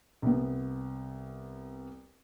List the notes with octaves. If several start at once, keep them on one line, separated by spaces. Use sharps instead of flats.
C2 B3